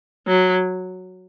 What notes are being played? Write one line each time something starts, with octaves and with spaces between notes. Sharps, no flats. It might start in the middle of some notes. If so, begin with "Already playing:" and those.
F#3